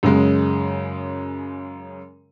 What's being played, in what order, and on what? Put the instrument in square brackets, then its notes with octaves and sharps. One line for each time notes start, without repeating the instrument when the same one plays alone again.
[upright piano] F#2 C#3 G#3